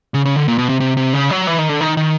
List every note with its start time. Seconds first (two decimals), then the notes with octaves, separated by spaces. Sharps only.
0.14 C#3
0.25 C#3
0.36 D3
0.48 A#2
0.58 B2
0.69 C3
0.80 C3
0.97 C3
1.13 C#3
1.30 F#3
1.47 E3
1.58 D#3
1.69 D3
1.80 D#3
1.97 D#3